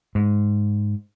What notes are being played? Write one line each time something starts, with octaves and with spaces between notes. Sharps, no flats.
G#2